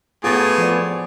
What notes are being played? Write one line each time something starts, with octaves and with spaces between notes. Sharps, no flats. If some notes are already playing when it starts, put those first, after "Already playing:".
A2 B3 F4 F#4 G#4
F3 D5